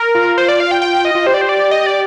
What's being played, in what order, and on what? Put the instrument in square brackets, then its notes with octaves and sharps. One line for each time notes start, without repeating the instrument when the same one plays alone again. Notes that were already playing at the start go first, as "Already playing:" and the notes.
Already playing: [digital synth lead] A#4
[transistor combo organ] F4
[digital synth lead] C5
D5
F5
G5
G5
D#5
[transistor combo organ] F4
[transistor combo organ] G4 [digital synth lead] C5
[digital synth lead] D5
C5
D5
D#5
D5